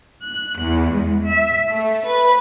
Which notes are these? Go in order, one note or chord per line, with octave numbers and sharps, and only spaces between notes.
F#6
E2
G#3
E5
A3
B4